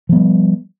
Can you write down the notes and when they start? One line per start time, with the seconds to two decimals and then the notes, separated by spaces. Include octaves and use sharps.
0.09 F3
0.12 B3
0.16 G3